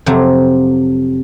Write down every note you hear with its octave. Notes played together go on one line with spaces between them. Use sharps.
F2 C3 F#3